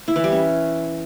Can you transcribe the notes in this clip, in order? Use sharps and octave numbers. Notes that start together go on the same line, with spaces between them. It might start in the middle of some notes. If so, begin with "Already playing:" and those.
E4
E3
G3
C#4